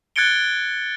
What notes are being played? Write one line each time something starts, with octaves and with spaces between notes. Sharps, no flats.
F#6 G#6 A6 C#7 D7 G7